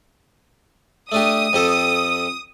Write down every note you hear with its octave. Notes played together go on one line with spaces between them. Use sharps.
A3 D4 G4 D#6
F2 G4 A4